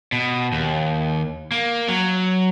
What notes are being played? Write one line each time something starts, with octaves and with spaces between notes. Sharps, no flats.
B2
D#2
A#3
F#3